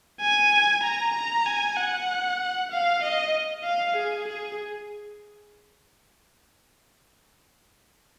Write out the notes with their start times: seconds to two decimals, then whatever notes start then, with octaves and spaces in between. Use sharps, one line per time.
0.21 G#5
0.83 A#5
1.14 A#5
1.46 G#5
1.77 F#5
2.71 F5
3.03 D#5
3.64 F5
3.96 G#4
4.28 G#4